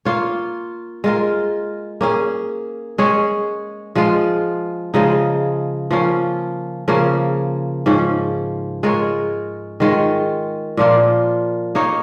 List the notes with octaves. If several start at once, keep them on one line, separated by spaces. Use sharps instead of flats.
A#3 F4 C#5
G#3 F4 A#4
A#3 C#4 G#4
G#3 C#4 G#4 C#5
F3 G#3 F4
C#3 F3 G#3 D#4
F3 A#3 C#4 F4
C#3 F3 A#3 C#4
G#2 F3 C#4
G#3 F4 A#4 C#5
D#3 G#3 F4 C#5
A#2 F3 A#3 F4
A#3 D#4 C#5